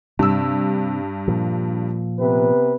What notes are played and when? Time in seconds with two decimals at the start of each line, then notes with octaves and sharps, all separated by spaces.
0.19 G2 C3 E6
1.28 A#2 F3
2.19 C3 B3 B4